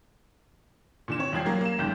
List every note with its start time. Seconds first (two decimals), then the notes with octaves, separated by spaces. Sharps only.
1.08 A#2 D3 E7
1.19 C4 C#5
1.32 F1 G2 F3 G5 G#6 C7
1.46 F#3 A#3
1.61 A#3 E7
1.78 F#1 D#2 G#2 C#3 G6